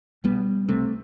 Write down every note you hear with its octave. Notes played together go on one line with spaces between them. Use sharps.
B1 B2 G3 B3
C2 C3 A3 C4